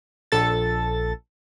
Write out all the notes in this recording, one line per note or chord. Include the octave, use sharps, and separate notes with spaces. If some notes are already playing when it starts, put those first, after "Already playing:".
A#1 A4 A6